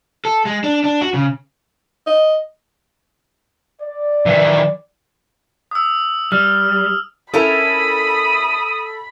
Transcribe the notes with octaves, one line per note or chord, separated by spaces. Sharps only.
A4
G#3
D4
D4
F#4
C#3
D#5
D5
D#3 E3
D#6 E6
G3 F6
C#4 E4 A4 A#4 B5 D#6